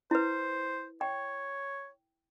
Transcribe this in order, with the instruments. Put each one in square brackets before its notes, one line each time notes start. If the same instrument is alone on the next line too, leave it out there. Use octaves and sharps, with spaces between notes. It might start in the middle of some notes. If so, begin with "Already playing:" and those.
[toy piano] E4 B4 [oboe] C5
[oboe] C#5 [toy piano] G5